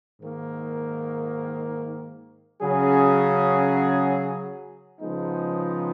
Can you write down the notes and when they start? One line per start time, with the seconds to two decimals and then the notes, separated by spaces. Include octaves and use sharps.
0.21 G#2 D#3 A#3
2.60 C#3 F#3 C#4 G#4
5.00 C#3 F3 G#3 B3 D#4